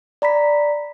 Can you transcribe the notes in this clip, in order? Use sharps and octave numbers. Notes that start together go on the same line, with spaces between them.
D5 A#5 B5 B6